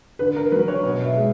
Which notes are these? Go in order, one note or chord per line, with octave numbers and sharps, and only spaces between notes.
D3 B4
A#4
F#3 B4
C#5
B2
E5
G#3